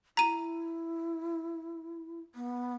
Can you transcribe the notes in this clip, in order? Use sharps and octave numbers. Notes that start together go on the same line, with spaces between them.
E4 A#5 D#7
B3